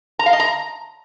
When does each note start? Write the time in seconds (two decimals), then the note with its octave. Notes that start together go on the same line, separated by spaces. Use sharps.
0.19 A#5
0.26 F5
0.33 D#5
0.40 A#5